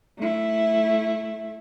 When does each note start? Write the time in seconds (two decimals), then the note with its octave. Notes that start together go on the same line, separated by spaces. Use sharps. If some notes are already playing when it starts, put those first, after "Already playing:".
0.19 A3 E4